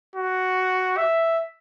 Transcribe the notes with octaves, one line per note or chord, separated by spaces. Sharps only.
F#4
E5